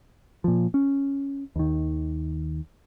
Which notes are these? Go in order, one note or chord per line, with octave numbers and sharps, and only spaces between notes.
A#2 F3
C#4
D#2 D#3